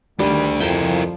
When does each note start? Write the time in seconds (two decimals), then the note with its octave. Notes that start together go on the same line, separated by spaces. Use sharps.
0.19 D2 D#3 G3 A3 D4
0.60 F2 F3 E4 A#4 G5